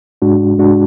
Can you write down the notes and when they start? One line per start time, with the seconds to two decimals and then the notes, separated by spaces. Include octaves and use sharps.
0.22 G#2 G#3 D4 F#4
0.58 G#2 G#3 D4 F#4